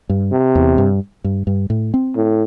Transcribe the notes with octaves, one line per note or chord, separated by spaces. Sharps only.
G2
C3
E2
G2
G2
G2
A2
C4
A2